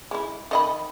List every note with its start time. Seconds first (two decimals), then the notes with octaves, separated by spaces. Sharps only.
0.11 G#3 E4
0.51 D#3 D#5 B5